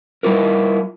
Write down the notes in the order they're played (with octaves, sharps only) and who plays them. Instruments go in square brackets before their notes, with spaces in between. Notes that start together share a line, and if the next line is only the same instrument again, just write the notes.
[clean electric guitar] G3 E4 F4 A#4